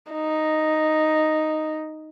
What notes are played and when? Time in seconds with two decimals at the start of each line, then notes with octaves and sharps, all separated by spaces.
0.12 D#4